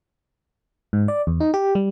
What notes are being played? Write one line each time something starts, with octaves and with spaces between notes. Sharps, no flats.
G#2
D5
E2
D#4
G4
G3